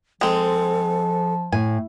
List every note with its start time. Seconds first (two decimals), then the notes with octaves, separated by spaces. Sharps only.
0.21 F3 G#3 C4 A4
1.52 A2 G#5